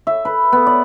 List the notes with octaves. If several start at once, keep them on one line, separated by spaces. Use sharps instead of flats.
E5
B4
B3
D5